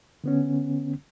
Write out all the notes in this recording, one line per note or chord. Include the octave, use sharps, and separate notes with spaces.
D3 B3 C#4